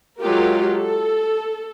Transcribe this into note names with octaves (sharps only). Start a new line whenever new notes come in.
F#3 G#3 F4 G4 A#4
A4